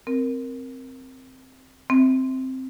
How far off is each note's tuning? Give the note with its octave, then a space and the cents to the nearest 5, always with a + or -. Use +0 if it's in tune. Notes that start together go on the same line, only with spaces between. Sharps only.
C4 +0 A#4 +0
C4 +0 E5 -20